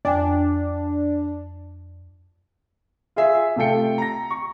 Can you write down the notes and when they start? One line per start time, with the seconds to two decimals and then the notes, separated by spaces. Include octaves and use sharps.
0.05 F2 D4 G5 G#5
3.16 F4 G#4 E5
3.56 C3 A3 F4 A4 G5 C#7
3.98 A#5 A#6
4.31 C#6